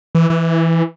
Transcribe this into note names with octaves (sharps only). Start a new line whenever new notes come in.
E3
E3